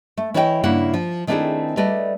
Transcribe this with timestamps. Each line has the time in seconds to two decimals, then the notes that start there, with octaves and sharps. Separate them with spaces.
0.17 A3
0.34 E3 E4 C#5 D#5 F5 G5
0.63 G2 C#3 A#3 E4 F#5
0.94 F3
1.27 D#3 A3 C4 D4 E4 G#4
1.77 G3 A3 B4 D5 D#5